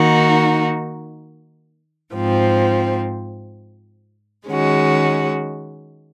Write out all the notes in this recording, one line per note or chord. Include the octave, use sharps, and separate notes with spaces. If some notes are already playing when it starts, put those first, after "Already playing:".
Already playing: D#3 A#3 D#4 F#4
G#2 F3 C4
D#3 G#3 C#4 F#4